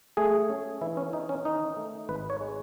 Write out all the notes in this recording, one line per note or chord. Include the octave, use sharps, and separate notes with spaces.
A3 G#4
C#4
E3 E4
C#4
E3 D#4
C#4
D#3 D#4
A3
G#1 B4
C#5
G#3